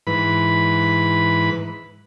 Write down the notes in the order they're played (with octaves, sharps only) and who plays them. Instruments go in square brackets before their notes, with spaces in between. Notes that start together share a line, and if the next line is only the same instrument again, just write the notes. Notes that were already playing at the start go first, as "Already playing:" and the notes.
[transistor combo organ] G#2 E3 B4 B5